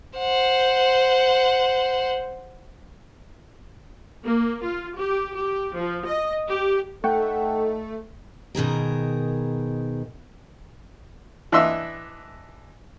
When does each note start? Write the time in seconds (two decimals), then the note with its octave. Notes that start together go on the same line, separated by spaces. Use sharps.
0.18 C5 F#5
4.23 A#3
4.64 F4
4.98 G4
5.34 G4
5.75 F3
6.06 D#5
6.47 G4
7.04 A3 D#4 A4 F#5 G5 C#6
8.55 B2 D#3 G#4 A#4
11.52 E3 D4 D#5 E5 C6 E6